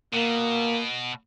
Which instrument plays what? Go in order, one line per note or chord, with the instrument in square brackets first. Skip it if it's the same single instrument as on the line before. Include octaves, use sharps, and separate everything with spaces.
[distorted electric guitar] B2 [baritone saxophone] A#3